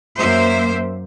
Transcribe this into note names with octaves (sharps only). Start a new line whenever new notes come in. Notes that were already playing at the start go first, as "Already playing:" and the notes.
F#2 A#3 C5 E5